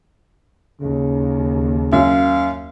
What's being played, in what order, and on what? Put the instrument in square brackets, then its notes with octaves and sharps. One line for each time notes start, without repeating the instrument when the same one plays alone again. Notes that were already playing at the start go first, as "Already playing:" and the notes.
[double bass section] D#2 [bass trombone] C#3
[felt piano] F#2 [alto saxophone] F5